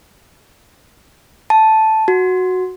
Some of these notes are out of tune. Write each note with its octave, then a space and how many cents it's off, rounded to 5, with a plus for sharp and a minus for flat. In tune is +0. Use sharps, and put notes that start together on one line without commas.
A5 -5
F#4 -5